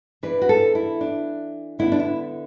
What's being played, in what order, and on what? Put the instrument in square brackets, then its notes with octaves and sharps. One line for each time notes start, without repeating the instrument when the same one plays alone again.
[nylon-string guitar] E3 D4 B4
F#4
A4
E4
D4
D3 B3 D4 E4
D4
E4